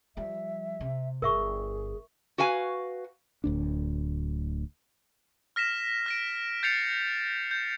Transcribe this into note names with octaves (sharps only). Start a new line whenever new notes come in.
F3 G3 E5
C3
G1 G2 G#4 A#4 E5 C#6
F#4 B4 F5 G#5
D1 D2 D4
F6 A#6 B6 E7
F6 A#6 D7
G6 A6 C7 C#7 F7
G6